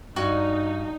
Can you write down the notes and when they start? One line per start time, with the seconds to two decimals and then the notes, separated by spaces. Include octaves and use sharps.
0.16 G2 D#4 F#4